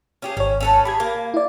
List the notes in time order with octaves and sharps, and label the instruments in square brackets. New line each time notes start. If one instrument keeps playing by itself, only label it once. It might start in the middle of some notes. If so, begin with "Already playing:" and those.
[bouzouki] C#4 G4 G#4
[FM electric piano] G#1 C#5 [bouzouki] C#4
[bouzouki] C#4 A4 B4
[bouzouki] G4 G#4 [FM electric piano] B5 G#6
[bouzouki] A#3
[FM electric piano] E4 D5